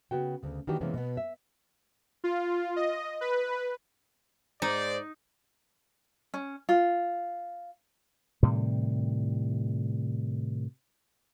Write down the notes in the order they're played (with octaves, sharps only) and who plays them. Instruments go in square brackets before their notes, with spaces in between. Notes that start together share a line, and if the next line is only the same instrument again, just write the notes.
[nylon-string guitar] C#3 B3 F#4 G5
D2 C#3
D#3 E3 A#3 D4 F#4 G4
C3 E3 G#3 A#3 B3 C#4
B2 B3
E5
[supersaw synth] F4
D#5
B4
[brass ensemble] G#2 C5 D5 [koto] D#4
[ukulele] C#4
F4
[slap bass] A2 C3 D#3 G3